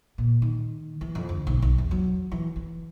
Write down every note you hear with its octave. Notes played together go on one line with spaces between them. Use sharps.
A#2
D#3
E3
F2
D2
B1
B1
E2
F#3
E3
E3